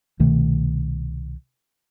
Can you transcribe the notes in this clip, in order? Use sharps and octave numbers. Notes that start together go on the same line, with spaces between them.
C2 B2 D#3 A3